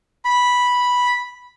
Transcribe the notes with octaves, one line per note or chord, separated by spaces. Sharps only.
B5